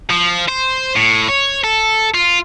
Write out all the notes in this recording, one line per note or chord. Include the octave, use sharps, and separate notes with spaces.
F3
C5
A2
C#5
A4
F4